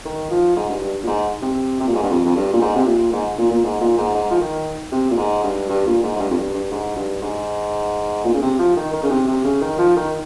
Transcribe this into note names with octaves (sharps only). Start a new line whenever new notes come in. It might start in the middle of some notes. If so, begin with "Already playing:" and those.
D#3
F3
G#2
G2
G2
A#2
G#2
C3
C3
A#2
G#2
G2
F2
F2
G2
A#2
G#2
C3
A#2
G#2
A#2
A#2
G#2
A#2
G#2
G#2
F3
D#3
C3
A#2
G#2
G2
G2
A#2
G#2
G#2
G2
F2
G2
G2
G#2
G2
G#2
A#2
C#3
C3
F3
D#3
D#3
C#3
C3
C3
C#3
D#3
F3
D#3